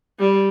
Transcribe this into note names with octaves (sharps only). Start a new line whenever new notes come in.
G3